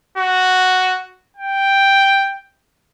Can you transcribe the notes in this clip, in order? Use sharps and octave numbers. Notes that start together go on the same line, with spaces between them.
F#4
G5